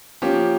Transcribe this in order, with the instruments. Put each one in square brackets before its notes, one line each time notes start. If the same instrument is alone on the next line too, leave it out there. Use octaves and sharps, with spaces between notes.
[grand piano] F3 A#3 C#4 G4